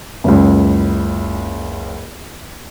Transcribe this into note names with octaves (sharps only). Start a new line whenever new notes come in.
F#1 C#2